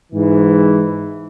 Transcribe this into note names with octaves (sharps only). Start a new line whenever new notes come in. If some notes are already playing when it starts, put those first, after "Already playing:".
G#2 E3